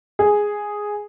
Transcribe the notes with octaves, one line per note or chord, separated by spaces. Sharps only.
G#4